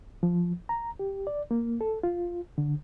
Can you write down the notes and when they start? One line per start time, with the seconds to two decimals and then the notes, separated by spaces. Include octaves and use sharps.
0.23 F3
0.69 A#5
0.99 G4
1.27 D5
1.51 A#3
1.81 A4
2.03 F4
2.58 D3